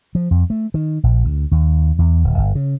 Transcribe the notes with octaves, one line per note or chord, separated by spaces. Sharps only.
F3
F2
A3
D#3
A#1
D2
D#2
E2
D1
G1
C#3